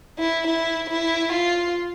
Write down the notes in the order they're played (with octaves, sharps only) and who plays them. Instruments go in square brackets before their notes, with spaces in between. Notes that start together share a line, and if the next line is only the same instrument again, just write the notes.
[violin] E4
E4
E4
F4